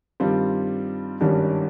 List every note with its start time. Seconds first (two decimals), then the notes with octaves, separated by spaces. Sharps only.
0.20 G2 D#3 G3 C4 F4
1.21 G#1 G2 D#3 G3 C#4